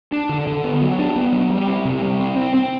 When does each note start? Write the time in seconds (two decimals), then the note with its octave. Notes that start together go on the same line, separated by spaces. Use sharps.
0.12 D4
0.29 D3
0.47 D3
0.64 B3
0.82 F#3
0.99 D4
1.16 B3
1.33 F#3
1.50 G3
1.68 C4
1.85 C3
2.02 G3
2.20 C4
2.36 C4
2.54 C4